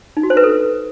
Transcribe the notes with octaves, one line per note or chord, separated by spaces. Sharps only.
D#4
F#4
C5
B4
A4